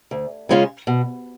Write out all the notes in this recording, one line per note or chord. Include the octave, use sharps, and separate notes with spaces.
D2
C#3 G#3 C#4 F4
B2